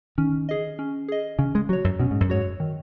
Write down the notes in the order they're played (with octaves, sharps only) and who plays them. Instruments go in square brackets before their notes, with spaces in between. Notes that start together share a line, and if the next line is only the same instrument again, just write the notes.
[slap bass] D#3 [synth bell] C#4
[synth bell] G#4 D#5
C#4
G#4 D#5
[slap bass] C#3 [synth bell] C#4
[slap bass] G#3
[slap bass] F#3 [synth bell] F#4 C#5
[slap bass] F#2
[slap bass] B2 [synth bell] C#4
[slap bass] G#2
F#2
[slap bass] G#2 [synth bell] F#4 C#5
[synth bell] D#3